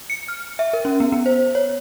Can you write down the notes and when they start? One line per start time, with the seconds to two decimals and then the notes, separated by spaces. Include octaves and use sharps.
0.10 C#7
0.28 F6
0.59 E5
0.73 A#4
0.85 C#4
1.00 B3
1.12 B3
1.26 C5
1.55 C#5